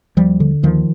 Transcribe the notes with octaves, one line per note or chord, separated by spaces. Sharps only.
D#2 F3 G3
D3
D#2 D#3 F3